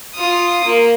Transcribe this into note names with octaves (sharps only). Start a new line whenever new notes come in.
F4 D#6
A#3